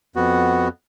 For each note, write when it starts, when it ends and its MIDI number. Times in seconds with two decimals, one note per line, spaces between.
0.16 0.68 41
0.16 0.68 59
0.16 0.68 66